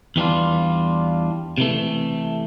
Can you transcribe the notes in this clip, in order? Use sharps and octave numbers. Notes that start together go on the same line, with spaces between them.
E2 E3 G3 D4 F4
C3 E3 A3